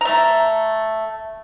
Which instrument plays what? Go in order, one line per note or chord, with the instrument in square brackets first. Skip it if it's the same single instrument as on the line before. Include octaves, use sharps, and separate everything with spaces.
[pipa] A3 A#5